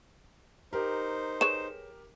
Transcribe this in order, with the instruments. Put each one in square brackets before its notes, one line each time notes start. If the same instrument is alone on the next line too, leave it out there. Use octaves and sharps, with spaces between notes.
[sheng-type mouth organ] D#4 C5 [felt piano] G4 A#4
[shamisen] G#4 B4 C#5 [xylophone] E7